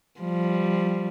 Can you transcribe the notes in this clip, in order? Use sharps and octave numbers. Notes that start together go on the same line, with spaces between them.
F3 G3